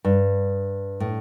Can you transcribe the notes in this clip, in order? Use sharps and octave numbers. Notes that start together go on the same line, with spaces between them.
G2
A2